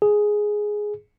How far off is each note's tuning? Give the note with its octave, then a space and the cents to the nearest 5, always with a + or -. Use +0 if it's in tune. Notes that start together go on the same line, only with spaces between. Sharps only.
G#4 +5